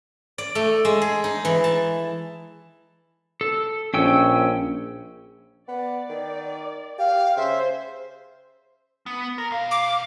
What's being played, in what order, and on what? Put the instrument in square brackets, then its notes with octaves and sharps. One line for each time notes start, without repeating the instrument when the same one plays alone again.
[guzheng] D5
A3
G#3
G#4
D#4
E3
A5
[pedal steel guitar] A4
[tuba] A#1 [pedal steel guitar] C#4 G5 E6
[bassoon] B3 [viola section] D5
[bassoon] D#3
[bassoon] G4 [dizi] F5
[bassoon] C#3 [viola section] C5 [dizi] E5
[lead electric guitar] B3
A#4
B1 F5
[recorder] D6